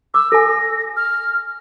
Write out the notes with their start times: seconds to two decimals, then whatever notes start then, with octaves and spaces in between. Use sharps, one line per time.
0.14 D6 E6
0.32 A4 G#5 A#6
0.97 F6